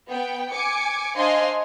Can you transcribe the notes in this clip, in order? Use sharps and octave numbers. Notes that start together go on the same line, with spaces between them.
B3 G5
G#5 D6 C#7
D4 C5 D#5 F5 G#5 C6